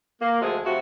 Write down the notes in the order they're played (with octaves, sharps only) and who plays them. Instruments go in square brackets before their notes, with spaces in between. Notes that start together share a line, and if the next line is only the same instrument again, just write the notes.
[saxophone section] A#3
D2 F3 G#3 A3 G#4
C3 F3 A3 E4 F#4